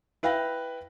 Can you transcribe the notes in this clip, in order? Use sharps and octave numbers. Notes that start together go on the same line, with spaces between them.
E4 B4 F5 G5 A#6